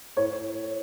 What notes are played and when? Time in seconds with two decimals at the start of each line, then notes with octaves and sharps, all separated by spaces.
0.16 A2 A3 C#5